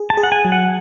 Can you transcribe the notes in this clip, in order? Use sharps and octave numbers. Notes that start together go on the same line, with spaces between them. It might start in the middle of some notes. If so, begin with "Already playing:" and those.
Already playing: G#4
A5
G#4
F#5
G#5
F#3
F#5